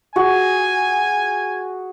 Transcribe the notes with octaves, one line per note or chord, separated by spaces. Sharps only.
F#4 G#4 G#5